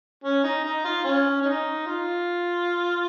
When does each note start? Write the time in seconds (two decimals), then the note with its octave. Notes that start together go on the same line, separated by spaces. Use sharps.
0.24 C#4
0.44 D#4
0.64 D#4
0.84 F4
1.04 C#4
1.41 C#4
1.45 D#4
1.86 F4